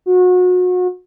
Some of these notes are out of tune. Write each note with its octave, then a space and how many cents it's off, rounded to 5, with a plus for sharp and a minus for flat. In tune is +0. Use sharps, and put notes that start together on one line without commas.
F#4 -30